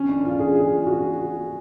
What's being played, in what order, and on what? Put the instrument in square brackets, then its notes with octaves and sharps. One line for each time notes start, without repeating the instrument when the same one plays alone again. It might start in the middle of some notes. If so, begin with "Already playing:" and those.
Already playing: [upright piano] C#4
D4
F4
G#4
G#4
F#4